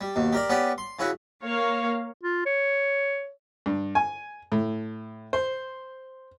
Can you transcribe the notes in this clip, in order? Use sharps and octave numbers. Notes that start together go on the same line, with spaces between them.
G3
D#2 B2
G4 A#4 D5
B3 C#4 G4 D5
C6
C#3 C#4 E4 F#4
A#3 C#5 F5
F4
C#5
G2
G#5
A2
C5